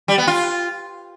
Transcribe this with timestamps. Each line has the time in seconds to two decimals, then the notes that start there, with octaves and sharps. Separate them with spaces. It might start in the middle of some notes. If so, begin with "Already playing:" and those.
0.08 G3
0.18 B3
0.27 F4